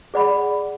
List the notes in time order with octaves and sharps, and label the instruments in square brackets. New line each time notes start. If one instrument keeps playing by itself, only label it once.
[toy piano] G#4 D5 F#5 B5